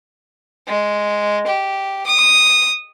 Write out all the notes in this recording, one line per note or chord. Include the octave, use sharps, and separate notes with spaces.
G#3
G4
D#6